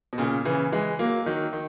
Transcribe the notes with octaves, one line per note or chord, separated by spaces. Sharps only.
B2
A#2 C#3
C#3 E3
E3 G#3
F#3 A#3
D#3 F#3
D#3